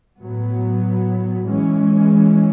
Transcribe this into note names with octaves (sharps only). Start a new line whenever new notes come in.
A2 F#3 B3
E3 G#3 C#4